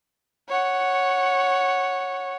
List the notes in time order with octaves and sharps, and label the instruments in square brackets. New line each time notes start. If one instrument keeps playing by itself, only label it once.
[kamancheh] C#5 F#5